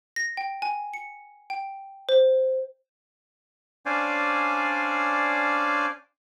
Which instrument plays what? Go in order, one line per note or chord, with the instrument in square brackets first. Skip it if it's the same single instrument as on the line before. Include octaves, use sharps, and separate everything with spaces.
[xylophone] A#6
G5
G#5
C#7
G5
C5
[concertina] C#4 D4 C5 D5 F5 G#5